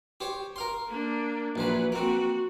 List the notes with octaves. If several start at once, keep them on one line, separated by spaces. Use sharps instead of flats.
G4 C5 C#5
A#4 F5 C6
A#3 D4
A#1 E3 F#3 B4 C5
A#3 C4 F#4